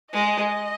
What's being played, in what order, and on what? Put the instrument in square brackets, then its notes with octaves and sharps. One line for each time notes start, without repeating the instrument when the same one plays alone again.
[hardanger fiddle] G#3 [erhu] D#5